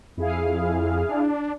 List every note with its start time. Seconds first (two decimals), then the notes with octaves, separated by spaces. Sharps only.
0.17 F2 E4 G#4 F5
1.09 D4